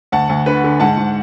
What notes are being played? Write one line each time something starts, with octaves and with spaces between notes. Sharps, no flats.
D2 F#5 A5
D2
D3 B4
D3
G#2 F#5 A5
G#2